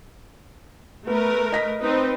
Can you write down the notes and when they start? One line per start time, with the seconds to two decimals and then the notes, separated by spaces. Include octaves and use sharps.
1.07 A3 B3 A#4 B4
1.52 D#5 A#6 B6
1.81 C4 D#4 B4